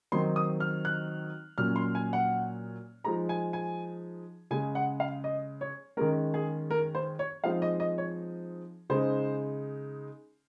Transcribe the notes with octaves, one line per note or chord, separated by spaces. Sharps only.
D#3 F#3 C4 D#4 C6
D#6
F6
F#6
A#2 F#3 C#4 F6
C6
G#5
F#5
F3 G#3 D#4 A#5
G#5
G#5
C#3 G#3 C#4 G#5
F#5
F5
D#5
C#5
D#3 G#3 C#4 A#4
G#4
A#4
C5
C#5
F3 G#3 C4 D#4 F5
D#5
D#5
C#5
C#3 G#3 D#4 C5